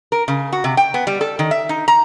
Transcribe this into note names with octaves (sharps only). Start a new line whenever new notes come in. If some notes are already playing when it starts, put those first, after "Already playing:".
A#4
C#3
F#4
C3
G5
B3
G3
A4
D#3
E5
D#4
A#5